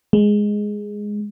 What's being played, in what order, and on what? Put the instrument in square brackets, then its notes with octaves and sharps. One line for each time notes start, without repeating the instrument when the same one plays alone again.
[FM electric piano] G#3